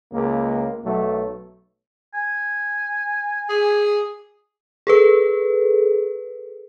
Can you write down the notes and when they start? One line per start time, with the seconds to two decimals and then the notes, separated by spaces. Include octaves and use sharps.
0.13 C#2 A#3
0.85 B1 F#3 A3
2.14 G#5
3.49 G#4
4.87 G#4 A4 B4